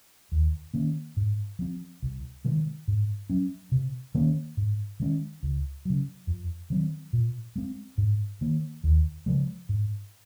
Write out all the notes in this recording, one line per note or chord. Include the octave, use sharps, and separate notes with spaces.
D#2
D#3 A#3 C#4
G#2
F3 C4
C2
C3 D#3 G#3
G#2
F#3 C#4
C3
D#3 A#3 C#4
G#2
D#3 G#3 C#4
C#2
C#3 F#3
F2
D#3 F#3 C4
A#2
G#3 C4
G#2
D#3 A#3
D#2
C#3 F3 G#3
G#2